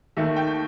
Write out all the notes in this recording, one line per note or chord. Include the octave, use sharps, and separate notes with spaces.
D#2 D#3 A3 E5
G5